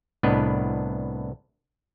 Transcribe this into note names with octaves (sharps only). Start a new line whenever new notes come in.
C2 A2 B3 D4 B4 D#5